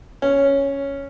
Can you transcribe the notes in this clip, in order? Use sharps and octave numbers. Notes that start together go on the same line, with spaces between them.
C#4